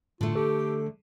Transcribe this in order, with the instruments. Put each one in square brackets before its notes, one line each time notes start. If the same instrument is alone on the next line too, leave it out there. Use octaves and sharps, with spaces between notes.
[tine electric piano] A2 [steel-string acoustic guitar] D3 A3 [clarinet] F4
[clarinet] G4 [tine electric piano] A4